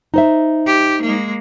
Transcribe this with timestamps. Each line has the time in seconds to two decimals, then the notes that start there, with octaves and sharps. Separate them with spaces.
0.14 D#4 C5 E5
0.67 G4
1.02 G#3 A#3